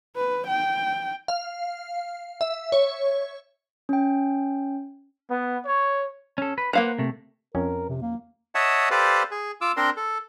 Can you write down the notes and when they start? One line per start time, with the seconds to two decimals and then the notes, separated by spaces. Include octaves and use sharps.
0.16 B4
0.48 G5
1.28 F5
2.41 E5
2.72 C#5
3.89 C#4 G5
5.30 B3
5.65 C#5
6.38 C#4 A4
6.58 B4
6.73 A#3 B4 C5 F5 F#5 A#5
6.99 C3 A3
7.55 F2 C#4 A#4
7.89 C3
8.02 A#3
8.55 C#5 D#5 E5 F#5 A5
8.91 G4 A4 B4 C5 D5 F5
9.31 G#4
9.61 F4 D6 E6
9.77 C4 D4 A#4 C6
9.97 A4